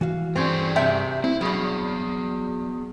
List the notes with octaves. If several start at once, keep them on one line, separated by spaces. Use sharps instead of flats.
E3 F#4 F5
G2 C4 C#4 G#4 D5
C3 E5 G5
C4 E4
G2 B2 F#3 B3 G#4